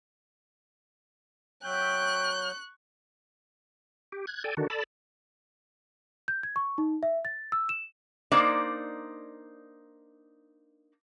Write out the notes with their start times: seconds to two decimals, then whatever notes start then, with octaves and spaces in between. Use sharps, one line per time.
1.64 F#3 E5 G5 C#6 F#6 G6
4.12 G4
4.27 F#6 G#6
4.44 A4 D5 G5 G#5
4.57 D3 D#3 D4 F#4
4.70 A4 D5 A5 B5
6.28 G6
6.43 G#6
6.56 C#6
6.78 D#4
7.03 E5
7.25 A6
7.52 E6
7.69 E7
8.32 A#3 D4 D#4 C5 D5